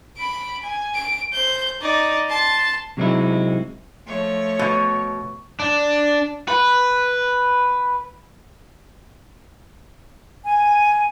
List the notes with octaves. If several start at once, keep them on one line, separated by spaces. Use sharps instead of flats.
B5 D7
G#5
D7
C5 G6
D#4 D5
A5 C6
C3 F#3 G#3 C4 D#4 E4
F3 A3 C#5
B2
D4
B4
G#5